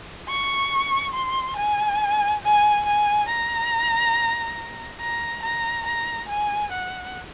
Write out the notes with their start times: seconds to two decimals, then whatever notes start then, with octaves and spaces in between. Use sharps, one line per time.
0.28 C#6
1.14 C6
1.56 G#5
2.43 G#5
2.85 G#5
3.28 A#5
5.00 A#5
5.42 A#5
5.86 A#5
6.29 G#5
6.72 F#5